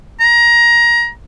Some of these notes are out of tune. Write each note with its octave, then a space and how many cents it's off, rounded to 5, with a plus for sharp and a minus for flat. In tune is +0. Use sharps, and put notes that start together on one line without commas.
A#5 +20